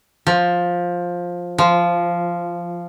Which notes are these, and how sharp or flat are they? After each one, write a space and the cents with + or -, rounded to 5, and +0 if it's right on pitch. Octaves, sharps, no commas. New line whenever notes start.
F3 +10
F3 -10